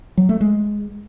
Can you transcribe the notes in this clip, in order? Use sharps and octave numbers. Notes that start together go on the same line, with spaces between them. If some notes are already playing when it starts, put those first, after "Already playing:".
F#3
A3
G#3